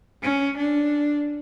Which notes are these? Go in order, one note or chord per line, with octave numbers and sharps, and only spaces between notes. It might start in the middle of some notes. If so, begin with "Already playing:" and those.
C#4
D4